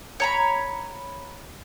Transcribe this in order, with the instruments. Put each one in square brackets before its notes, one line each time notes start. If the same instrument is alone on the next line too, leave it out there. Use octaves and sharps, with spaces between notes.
[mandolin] C#5 A#5 B5